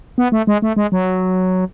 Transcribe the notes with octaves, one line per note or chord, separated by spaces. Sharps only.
B3
A3
G#3
A3
G#3
F#3